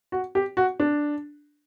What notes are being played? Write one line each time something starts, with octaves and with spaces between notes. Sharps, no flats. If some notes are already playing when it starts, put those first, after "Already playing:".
F#4
G4
F#4
D4